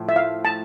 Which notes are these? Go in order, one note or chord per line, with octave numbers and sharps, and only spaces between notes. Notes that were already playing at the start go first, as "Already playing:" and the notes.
Already playing: A2 F3
E5
F5
A5